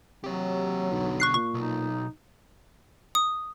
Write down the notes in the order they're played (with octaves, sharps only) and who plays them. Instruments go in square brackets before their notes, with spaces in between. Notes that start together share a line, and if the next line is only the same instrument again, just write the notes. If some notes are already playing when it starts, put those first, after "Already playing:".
[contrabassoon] C3 [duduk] F#3 [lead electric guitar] G4 C#5
[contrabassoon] B1 [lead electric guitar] B2 D3
[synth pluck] C#6 F#6 C7
[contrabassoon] A#2 [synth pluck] C#6
[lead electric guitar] B1 [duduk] D#4
[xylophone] D#6